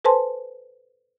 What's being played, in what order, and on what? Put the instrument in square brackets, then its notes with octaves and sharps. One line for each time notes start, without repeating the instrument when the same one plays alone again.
[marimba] A4 B4 C5 G#5 A5 C6